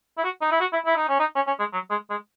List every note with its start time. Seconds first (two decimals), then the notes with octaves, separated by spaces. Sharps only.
0.18 E4
0.24 F#4
0.42 D#4
0.52 E4
0.61 F#4
0.73 E4
0.86 E4
0.97 D#4
1.09 C#4
1.20 D#4
1.36 C#4
1.47 C#4
1.59 G#3
1.73 F#3
1.90 G#3
2.10 G#3